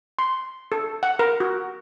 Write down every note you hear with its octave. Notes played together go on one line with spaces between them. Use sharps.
C6
A4
F#5
A#4
F#4